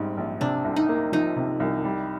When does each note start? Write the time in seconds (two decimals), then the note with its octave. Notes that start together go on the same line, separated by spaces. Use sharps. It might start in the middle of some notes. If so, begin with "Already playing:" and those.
Already playing: A#1 G#2 G3 C4
0.17 A#1
0.41 C3 D4
0.64 C2
0.76 D#4
0.89 A#3
1.12 F3 D#4
1.36 C3
1.60 C2
1.85 G3